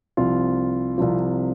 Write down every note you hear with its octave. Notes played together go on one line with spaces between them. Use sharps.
C2 C3 F3 F4
C2 C3 F3